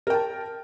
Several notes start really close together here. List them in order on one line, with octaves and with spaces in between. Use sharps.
A#4 G5 A5